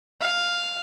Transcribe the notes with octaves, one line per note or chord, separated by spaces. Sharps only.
F5